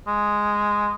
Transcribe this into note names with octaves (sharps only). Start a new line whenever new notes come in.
G#3